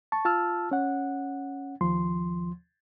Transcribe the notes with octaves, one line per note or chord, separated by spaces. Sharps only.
A5 C#6
F4 A5 E6 F6
C#4 F#5
D#2 F3 C6